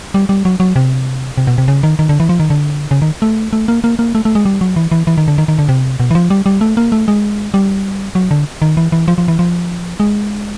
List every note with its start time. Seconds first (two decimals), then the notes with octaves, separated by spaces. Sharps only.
0.14 G3
0.29 G3
0.45 F#3
0.60 F#3
0.76 C3
1.38 C3
1.47 B2
1.58 C3
1.68 C#3
1.83 D#3
1.99 D#3
2.09 D3
2.20 E3
2.29 F3
2.40 D#3
2.50 D3
2.91 C#3
3.02 D#3
3.22 A3
3.53 A3
3.68 A#3
3.84 A#3
3.99 A#3
4.15 A3
4.25 A3
4.35 G#3
4.45 G3
4.61 F#3
4.76 E3
4.92 E3
5.07 E3
5.18 D#3
5.28 D3
5.38 D#3
5.48 D#3
5.59 D3
5.69 C3
6.00 B2
6.11 E3
6.15 F3
6.30 G3
6.46 G3
6.61 A3
6.77 A#3
6.92 A3
7.08 G#3
7.54 G3
8.15 F#3
8.31 D3
8.62 D#3
8.77 E3
8.92 E3
9.08 F3
9.18 F3
9.28 E3
9.39 F3
10.00 G#3